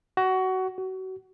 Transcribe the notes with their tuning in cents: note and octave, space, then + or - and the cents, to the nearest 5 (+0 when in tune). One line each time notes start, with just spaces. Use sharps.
F#4 +20
F#4 +30